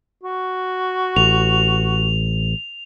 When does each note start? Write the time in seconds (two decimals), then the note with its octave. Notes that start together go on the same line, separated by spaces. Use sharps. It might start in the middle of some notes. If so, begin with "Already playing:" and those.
0.23 F#4
1.16 A1 F7